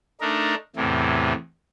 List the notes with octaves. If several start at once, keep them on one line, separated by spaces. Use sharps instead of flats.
A3 D4 D#4 A#4
E2 A2 C3 E3